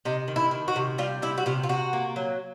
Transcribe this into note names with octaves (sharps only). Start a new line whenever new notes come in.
C3 D#4
D#3
E4
D#3
F#4
C3
G3 F4
C3 E4
F#4
C3 F4
F4
C3 F#4
A#3
F#3